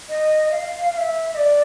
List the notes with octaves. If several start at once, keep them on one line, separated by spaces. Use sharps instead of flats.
D#5
F5
F5
E5
D#5
D5